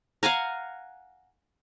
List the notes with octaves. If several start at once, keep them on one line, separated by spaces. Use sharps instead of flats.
F5 F#5 G#5 A#5